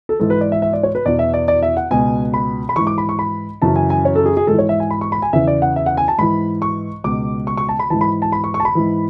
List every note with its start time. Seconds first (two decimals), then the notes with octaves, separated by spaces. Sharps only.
0.09 A4
0.20 G#2 E3 A4
0.30 B4
0.41 D5
0.52 E5
0.62 E5
0.73 D5
0.83 C#5
0.95 B4
1.05 E2 B2 D5
1.19 E5
1.34 D5
1.48 D5
1.62 E5
1.77 F#5
1.91 C#2 B2 G#5
2.34 B5
2.69 B5
2.76 G#2 E3 C#6
2.87 D6
2.98 B5
3.09 C#6
3.19 B5
3.62 F#2 C#3 E3 A5
3.76 G#5
3.90 G#5
4.05 C#5
4.15 A4
4.26 G#4
4.37 G#4
4.47 G#2 E3 A4
4.58 C#5
4.69 E5
4.80 G#5
4.90 B5
5.01 C#6
5.12 B5
5.22 G#5
5.33 E2 C#3 E3 E5
5.47 D5
5.62 F#5
5.76 E5
5.86 F#5
5.97 G#5
6.08 A5
6.18 G#2 E3 B5
6.62 C#6
7.04 C#2 B2 D6
7.47 C#6
7.57 C#6
7.69 A5
7.79 B5
7.90 E3 A5
7.94 G#2
8.01 B5
8.22 A5
8.32 B5
8.44 C#6
8.54 C#6
8.60 A5
8.65 B5
8.75 G#2 E3